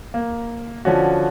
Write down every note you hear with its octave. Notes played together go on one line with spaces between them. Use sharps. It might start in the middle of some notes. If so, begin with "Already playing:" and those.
A#3
D3 F3 C#4 F#4